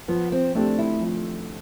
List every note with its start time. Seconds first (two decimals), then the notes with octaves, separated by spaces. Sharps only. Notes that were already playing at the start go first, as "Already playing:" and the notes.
0.08 F3 B3
0.32 C4
0.55 A3 C4 D4 G4
0.79 E4
1.01 F3